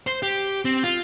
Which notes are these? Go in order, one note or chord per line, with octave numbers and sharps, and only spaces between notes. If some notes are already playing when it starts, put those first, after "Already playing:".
C5
G4
C4
F4